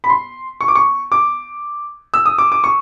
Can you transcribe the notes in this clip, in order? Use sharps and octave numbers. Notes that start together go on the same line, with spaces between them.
B5
C6
C#6
D6
C#6
D6
E6
D#6
D6
D6
C#6